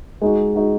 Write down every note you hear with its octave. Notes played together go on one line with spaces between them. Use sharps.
G#3 D#4 F#4
G#3 D#4 F#4